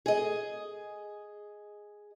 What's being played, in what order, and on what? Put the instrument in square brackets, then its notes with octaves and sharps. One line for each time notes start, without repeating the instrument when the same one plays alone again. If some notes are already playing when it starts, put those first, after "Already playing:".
[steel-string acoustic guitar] G#4 D#5